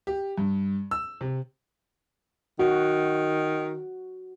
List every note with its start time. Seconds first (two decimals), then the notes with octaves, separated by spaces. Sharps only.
0.07 G4
0.38 G2
0.91 E6
1.21 C3
2.59 D#3 F#4